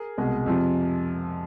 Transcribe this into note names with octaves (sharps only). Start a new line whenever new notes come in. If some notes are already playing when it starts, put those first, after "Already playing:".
Already playing: G#4 A#4
C2 B2 G#3
F2 C3 F3